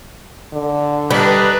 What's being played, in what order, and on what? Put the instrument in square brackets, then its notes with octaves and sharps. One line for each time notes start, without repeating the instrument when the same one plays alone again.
[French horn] D3
[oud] G3 [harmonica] D4 D#4 [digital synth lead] B4